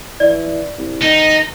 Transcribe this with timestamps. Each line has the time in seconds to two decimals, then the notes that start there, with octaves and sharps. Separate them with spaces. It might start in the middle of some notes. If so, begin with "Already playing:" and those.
0.20 E3 D5
0.78 C2
1.02 D#3 D#4